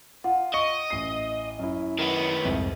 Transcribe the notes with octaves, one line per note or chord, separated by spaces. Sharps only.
F4 F#5
D#5 C#6 C#7 D7
A1 C7
F#2 E4
D#3 B3
C2 F2 G#2